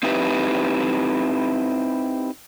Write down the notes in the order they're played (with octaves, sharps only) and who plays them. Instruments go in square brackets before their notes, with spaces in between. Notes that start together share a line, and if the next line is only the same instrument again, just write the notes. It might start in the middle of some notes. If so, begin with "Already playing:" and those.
[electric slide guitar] C4 D#4 E4 G4 B4